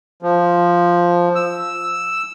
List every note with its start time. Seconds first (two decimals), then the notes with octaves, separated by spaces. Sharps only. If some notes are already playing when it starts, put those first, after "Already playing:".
0.22 F3
1.35 E6